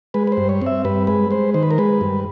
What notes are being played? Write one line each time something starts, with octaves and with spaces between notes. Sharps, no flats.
G#3 B4
B4
C5
G2
C#5
C4 E5
G2 B4
G#3 B4
G#3 C5
D#3 C5
B4
A#4
G#3 B4
G2